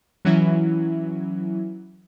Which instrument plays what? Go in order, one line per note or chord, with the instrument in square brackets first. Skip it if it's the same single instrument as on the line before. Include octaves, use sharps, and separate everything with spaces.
[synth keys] E3 F#3 C#4 E4